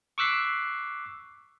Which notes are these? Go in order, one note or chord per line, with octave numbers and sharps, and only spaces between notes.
C#6 D6 E6 F#6 B6 C7